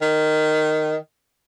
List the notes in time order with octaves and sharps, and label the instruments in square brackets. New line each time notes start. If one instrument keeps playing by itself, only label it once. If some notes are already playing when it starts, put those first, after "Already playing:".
[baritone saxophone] D#3